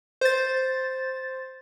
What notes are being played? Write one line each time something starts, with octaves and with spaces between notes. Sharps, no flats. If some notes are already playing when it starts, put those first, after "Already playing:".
C5 A6